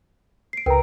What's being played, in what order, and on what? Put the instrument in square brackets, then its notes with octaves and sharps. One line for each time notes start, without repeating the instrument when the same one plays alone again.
[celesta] C7 D7
[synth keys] C#2 A#5 [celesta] A#4 B4 G5